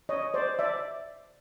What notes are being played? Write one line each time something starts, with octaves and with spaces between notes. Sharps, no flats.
C#5 D#5
C5 D5
D5 E5